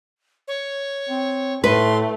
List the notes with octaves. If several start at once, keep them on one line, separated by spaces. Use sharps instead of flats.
C#5
C4
A2 A3 B4 C6